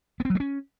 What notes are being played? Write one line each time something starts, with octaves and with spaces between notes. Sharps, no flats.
B3
C4
F#3
A3
C#4